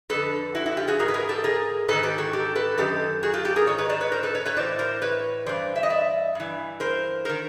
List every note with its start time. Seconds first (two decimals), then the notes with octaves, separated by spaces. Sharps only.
0.09 F2 D3 A4 B4
0.55 E4 F#4
0.66 E4 F#4
0.77 F4 G4
0.88 F#4 G#4
0.99 G#2 E3 G#4 A#4
1.08 B4
1.14 G#4 A#4
1.29 G4 A4
1.44 G#4 A#4
1.88 G#2 D#3 A4 B4
2.03 G4 A4
2.18 F#4 G#4
2.33 G4 A4
2.55 A4 B4
2.78 F#2 D#3 G4 A4
3.23 F#4 G#4
3.33 F4 G4
3.45 G4 A4
3.56 G#4 A#4
3.67 G#2 D#3 C#5
3.78 B4 C#5
3.89 C5 D5
4.01 B4 C#5
4.12 A#4 C5
4.23 A4 B4
4.35 B4 C#5
4.46 B4 C#5
4.57 A2 E3 C5 D5
4.79 A#4 C5
5.02 B4 C#5
5.46 G2 E3 C5 D5
5.76 E5
5.83 D#5
5.90 D5 E5
6.35 G2 E3
6.80 A#4 C5
7.25 D#3 A#4 C5